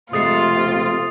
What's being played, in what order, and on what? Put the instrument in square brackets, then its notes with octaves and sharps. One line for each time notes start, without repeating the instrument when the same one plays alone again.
[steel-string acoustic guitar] F2 G#3 A3 [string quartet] C3 [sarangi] F4 [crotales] D#6 A6 C7